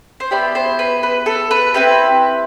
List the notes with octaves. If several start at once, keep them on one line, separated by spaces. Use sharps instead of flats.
C5
B3 E4 G4 D5
C5
B4
B4
A4
B4
C4 E4 G4 B4